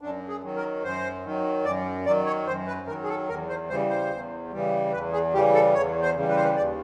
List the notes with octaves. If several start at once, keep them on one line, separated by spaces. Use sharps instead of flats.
F#2 D4
G#4
D#3 F#3
A#4
F#2 C5
D#3 F#3
F#2 D5
D#3 F#3 D5
C#5
F#2 C5
B4
D#3 F#3 A#4
G#4
A4
E2 A#4
C5
C#3 E3 G3 C5
C5
E2
C#3 E3 G3
E2 B4
G#4
C#3 E3 G3 G4
A4
E2 C#5
C5
C#3 E3 G3
B4
C5
B4
D#2 D5